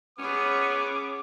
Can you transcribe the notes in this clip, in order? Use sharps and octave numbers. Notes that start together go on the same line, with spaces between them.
B3 C#4 G#4 C#5 D6